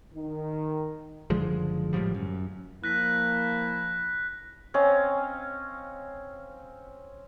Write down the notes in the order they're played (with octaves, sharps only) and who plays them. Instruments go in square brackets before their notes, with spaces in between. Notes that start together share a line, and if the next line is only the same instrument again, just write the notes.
[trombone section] D#3
[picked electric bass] F#1 D3 F3 G#3
G#1 A2 F3 G3
F#2
[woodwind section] F3 E4 [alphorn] A#3 [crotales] F#6 A#6 B6
[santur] C4 C#4 D#5 F5